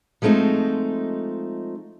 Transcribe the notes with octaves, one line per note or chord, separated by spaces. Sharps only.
F3 G#3 A3 C4 D#4